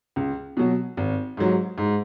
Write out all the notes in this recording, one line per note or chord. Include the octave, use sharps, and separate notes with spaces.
C#2
B2 F#3
G#1
G#2 F#3
G#2